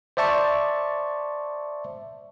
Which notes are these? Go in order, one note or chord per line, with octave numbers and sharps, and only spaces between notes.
C5 D5 E5 A5 C#6